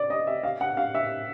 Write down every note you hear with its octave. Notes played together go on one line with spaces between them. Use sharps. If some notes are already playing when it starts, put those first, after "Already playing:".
Already playing: D5
D#5
E5
F5
F#5
F5
E5